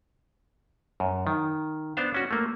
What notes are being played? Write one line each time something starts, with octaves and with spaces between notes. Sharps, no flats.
F#2
D#3
B3 D4 C5 F5
C#4 F#4
A3 A#3